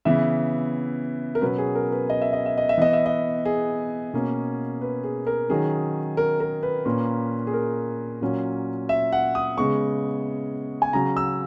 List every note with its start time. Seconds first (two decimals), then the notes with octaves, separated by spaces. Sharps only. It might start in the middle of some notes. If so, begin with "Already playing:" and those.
0.05 C#3 E3 B3 E5
1.35 A#4
1.41 B2 F#3 C#4 B4
1.58 G#4
1.75 A#4
1.92 B4
2.10 D#5
2.22 E5
2.33 D#5
2.46 E5
2.58 D#5
2.69 E5
2.78 E3 B3 D#5
2.93 E5
3.06 D#5
3.45 G#4
4.14 B2 A#3 C#4
4.82 B4
5.04 G#4
5.27 A#4
5.49 D#3 F#3 C#4 G#4
6.17 A#4
6.40 A#4
6.63 B4
6.85 A#2 A#3 C#4
7.47 G#4
7.53 A#4
8.21 A#2 F#3 C#4
8.89 E5
9.12 F#5
9.35 D#6
9.57 C#3 G#3 B3 C#6
10.82 G#5
10.93 C#3 F#3 C#4 A#5
11.17 E6